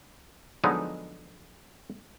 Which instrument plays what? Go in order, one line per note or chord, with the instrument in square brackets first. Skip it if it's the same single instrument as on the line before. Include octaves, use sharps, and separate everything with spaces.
[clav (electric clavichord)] D3 F3 F#3 G#3 B3 D#4